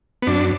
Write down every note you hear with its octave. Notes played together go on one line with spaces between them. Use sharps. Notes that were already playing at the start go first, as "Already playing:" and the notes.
B3
F#2 D4